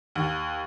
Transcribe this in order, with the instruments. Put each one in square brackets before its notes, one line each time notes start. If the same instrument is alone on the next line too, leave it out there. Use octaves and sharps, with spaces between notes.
[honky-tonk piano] D#2